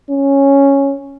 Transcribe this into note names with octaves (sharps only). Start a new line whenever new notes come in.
C#4